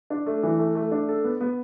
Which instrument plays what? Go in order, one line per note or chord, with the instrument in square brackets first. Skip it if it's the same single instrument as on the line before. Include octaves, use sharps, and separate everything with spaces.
[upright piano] D4
A3
E3
A3
A3
D4
A4
B3
B3